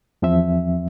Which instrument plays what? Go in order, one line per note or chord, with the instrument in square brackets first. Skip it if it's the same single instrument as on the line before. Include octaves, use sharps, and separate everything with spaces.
[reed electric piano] E2 F3 C4 E5